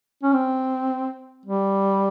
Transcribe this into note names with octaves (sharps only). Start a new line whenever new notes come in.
C#4
C4
G3